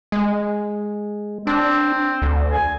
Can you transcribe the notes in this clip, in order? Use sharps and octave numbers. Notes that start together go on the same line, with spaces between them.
G#3
C4 D4
D2
G#5